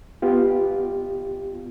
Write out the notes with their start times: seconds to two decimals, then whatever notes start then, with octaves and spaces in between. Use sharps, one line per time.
0.22 B3 F4 G4